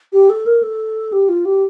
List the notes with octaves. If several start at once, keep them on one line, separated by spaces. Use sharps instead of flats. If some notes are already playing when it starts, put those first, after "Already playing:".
G4
A4
A#4
A4
G4
F4
G4